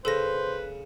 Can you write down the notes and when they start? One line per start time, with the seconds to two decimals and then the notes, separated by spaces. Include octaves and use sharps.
0.05 C#3 A4 B4 C5 A#6